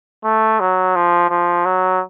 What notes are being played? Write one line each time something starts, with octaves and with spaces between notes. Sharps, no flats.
A3
F#3
F3
F3
F#3